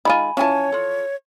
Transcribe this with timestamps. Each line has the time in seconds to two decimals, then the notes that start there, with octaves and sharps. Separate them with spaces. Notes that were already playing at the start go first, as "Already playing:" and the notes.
0.05 D#3 G#3 F4 G#5 B5
0.37 E3 F3 C#4 C#5 G#5 A5
0.72 F4 A4